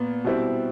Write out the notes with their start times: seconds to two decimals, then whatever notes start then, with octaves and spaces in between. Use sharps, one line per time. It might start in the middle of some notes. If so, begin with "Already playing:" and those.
Already playing: A#2 B3
0.24 B2 G3 C4 E4